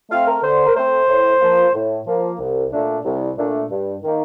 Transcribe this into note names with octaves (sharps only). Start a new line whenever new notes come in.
A3 C4 F5
A#4
D3 C5
A#4
A3 C4 C5
A2
F3 A#3
A2
F3 A#3
C2
A#2 A3 D4
C2
A#2 A3 D4
G2
D#3 A#3